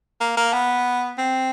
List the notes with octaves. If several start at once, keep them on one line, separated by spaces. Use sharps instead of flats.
A#3
A#3
B3
C4